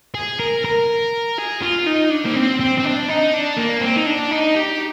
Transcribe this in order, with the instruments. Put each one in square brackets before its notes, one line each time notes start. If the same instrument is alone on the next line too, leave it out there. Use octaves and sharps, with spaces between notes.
[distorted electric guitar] G#4
A#4
A#4
G#4
F4
D#4
D4
A#3
C4
C4
C4
D4
D#4
D4
A#3
C4
D#4
D4
D#4
G4